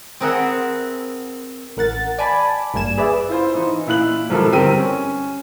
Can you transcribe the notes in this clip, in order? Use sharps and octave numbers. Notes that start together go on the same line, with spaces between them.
C4 G#4 A#4 B4 E5 F#5
A1 A#4 F#5 A6
D5 G#5 A5 B5
G#1 G2 A#3 G#5 E7
G#4 B4 D5 E5
E4 F4 C5
E3 D#4
A#2 E4 F5 F#6 F#7
G#1 B2 F3 E4 A4 A#4
G1 G2 C4 G4 A#4 D#7
C#4